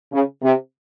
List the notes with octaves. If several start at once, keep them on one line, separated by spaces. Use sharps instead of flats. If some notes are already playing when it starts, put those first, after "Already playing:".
C#3
C3